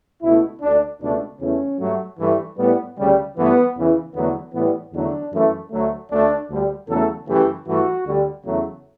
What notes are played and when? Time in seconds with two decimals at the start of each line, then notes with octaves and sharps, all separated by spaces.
0.23 C#2 B2 A3 E4
0.62 D2 D3 A3 D4
1.01 C#2 B2 A3 D4
1.40 E2 C#3 E3 A3 C#4
1.80 G2 F#3 A3
2.19 G2 E3 A3
2.58 A2 G3 B3
2.97 D2 C#3 G3
3.36 G2 E3 A3 B3
3.75 E2 C#3 E3
4.14 E2 D3 F#3 A3 B3
4.53 A2 E3 G3 B3
4.93 E2 D3 F#3 A3 D4
5.32 F#2 E3 A3
5.71 D2 D3 F#3 A3
6.10 D2 D3 A3 D4
6.49 D2 D3 G3
6.88 E2 C#3 F#3 A3 A4
7.27 F#2 C#3 E3 A3 G4
7.66 G2 E3 A3 F#4
8.06 D2 D3 G3
8.45 E2 C#3 F#3 A3